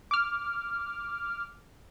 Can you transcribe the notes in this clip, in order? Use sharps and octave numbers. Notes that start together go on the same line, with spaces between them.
D6 F6